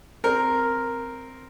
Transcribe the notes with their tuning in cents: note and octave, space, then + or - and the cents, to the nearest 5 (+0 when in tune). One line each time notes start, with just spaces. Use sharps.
C4 +0 A#4 +0